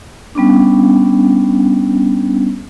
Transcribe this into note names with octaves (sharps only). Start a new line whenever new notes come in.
G3 B3 C#4 D4